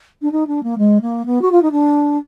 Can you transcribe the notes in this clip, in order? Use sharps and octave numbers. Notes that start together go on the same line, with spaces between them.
D4
D#4
D4
A#3
G#3
A#3
B3
F#4
F4
D#4
D4